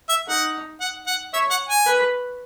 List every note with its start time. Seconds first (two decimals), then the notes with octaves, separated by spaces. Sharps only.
0.09 E5
0.28 D#4 F#5
0.81 F#5
1.07 F#5
1.33 C#5 E5
1.51 F#5
1.69 G#5
1.86 B4